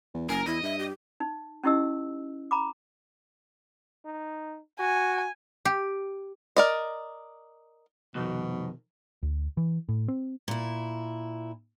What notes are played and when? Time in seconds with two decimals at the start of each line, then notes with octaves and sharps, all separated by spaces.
0.14 E2
0.29 F#1 A#4 G#5
0.46 E2 E4 D#5
0.63 G2 E5
0.79 G4
1.20 D#4
1.63 C#4 D#4 E4 G4 D#5 E6
2.51 A#5 B5 D6
4.05 D#4
4.80 F#4 G#5
5.65 G4
6.56 A#4 D5 D#5
8.15 C2 F2 B2 D#3
9.23 D2
9.57 E3
9.89 A2
10.08 C4
10.48 A#2 E4